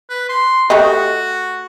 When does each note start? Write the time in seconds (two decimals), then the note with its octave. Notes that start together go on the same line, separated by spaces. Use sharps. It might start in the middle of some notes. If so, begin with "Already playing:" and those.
0.10 B4
0.29 C6
0.70 A3 F#4 G4 D#5